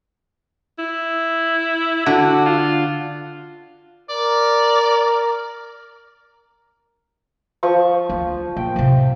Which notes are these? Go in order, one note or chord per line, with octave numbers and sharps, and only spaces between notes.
E4
D3 F#4
F4
A#4 D5
F3 C#6
D2
A#1 G5
A2 C3